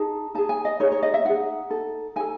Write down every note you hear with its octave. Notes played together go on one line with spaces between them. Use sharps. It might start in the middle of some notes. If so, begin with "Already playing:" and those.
Already playing: D#4 G#4 A5
D#4 G#4 A5
G#5
D#5
D#4 G#4 C#5
C#5
D#5
E5
D#4 G#4 F#5
D#4 A4
D#4 A4 G#5